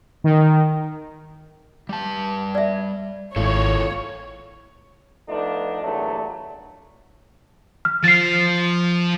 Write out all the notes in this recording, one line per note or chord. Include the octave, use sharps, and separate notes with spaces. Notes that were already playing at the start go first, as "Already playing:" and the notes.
D#3
G3 A5
D5 E5
G#1 E4 F4 A4 C#5
F3 A3 B3 D4 D#4 F4
E2 G2 A#2 F#3 A3 D4
F6
F3 A6 C7